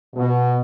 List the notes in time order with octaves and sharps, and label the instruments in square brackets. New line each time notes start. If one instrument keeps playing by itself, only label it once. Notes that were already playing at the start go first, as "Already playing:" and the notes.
[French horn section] B2